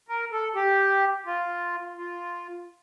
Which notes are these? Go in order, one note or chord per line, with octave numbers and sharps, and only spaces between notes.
A#4
A4
G4
F4
F4